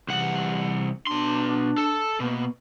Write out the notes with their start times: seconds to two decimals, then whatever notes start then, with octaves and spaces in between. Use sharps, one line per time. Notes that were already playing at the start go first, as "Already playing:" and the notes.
0.09 C2 C3 E3 F#5
1.07 B2 D4 C6
1.78 A4
2.20 B2 A#3 B3